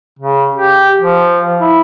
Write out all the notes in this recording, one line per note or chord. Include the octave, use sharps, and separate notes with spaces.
C#3
G4
F3
E4